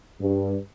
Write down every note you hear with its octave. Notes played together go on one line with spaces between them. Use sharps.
G2